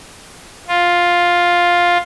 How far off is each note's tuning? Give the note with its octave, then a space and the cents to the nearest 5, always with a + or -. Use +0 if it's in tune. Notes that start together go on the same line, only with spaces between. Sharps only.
F4 +5